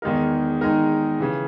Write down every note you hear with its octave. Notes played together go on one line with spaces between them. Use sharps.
E2 D#3 G#3 D#4 A#4
E2 D#3 G#3 D#4 A#4
C#3 E3